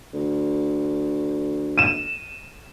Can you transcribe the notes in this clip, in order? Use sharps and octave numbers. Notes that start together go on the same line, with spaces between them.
D2
D#7 E7